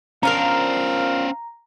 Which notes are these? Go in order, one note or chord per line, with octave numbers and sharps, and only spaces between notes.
F3 C#4 D4 A#4 C5 F5 A#5